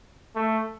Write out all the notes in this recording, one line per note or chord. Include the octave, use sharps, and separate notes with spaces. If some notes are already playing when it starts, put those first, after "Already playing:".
A3